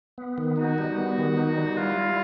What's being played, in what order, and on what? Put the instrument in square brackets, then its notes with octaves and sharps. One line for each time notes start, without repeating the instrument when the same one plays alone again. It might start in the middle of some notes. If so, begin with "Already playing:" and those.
[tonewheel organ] B3
D#3
[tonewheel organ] D#4 [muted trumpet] F#4
[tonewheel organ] G3
B3
D#3
D#4
G3
[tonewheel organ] E4 [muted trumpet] F4
[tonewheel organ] G3